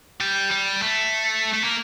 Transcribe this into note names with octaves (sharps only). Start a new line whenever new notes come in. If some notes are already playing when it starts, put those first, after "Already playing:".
G3
G3
A3
A3
A#3